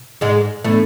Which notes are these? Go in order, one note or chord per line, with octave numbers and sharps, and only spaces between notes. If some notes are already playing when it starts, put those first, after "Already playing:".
Already playing: B2
G#2 G#3
A2 E3 A3 B3 D4